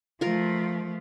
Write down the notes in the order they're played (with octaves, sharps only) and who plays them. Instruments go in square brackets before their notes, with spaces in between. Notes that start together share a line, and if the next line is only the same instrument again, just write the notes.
[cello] F3 A3 [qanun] F4 A#4